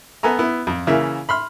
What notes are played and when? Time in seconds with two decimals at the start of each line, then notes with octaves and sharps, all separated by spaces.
0.23 B3 A4 G#5 A#5
0.39 B3 E4
0.67 F2
0.87 C#3 E3 A#3 E5
1.29 B5 C6 F6